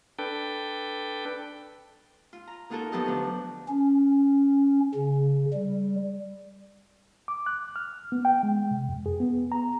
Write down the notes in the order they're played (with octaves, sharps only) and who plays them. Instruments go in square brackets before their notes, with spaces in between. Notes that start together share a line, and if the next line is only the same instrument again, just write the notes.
[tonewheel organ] D4 A4 B4 G5
[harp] F4
A#5
A#3 D#4 F4 F#4 A4 A#4
F3 F#3 B3 G4 A4 D#5
D2 D4
[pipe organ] C#4
C#3
G3
[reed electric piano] D6
F#6
F6
B3
G5
G#3
C3
F2
G#4
B3
A#5